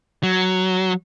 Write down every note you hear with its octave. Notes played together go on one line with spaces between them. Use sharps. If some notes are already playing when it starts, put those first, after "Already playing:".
F#3